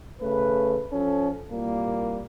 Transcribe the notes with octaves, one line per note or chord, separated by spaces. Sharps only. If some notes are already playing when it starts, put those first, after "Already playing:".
C#3 A3 B4
F3 C#4 A4
C2 A#2 G3 A#3